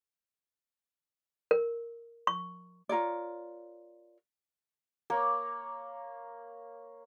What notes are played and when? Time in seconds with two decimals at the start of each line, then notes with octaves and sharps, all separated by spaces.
1.51 A#4
2.27 C#6
2.89 F4 A#4 C#5 D5
5.10 A#3 C#5 A#5 C#6